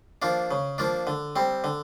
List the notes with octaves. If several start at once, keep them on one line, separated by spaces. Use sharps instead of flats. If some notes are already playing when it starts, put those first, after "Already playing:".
F3 A#3 D4
C#3
F3 A#3 D4
D3
G3 C4
D3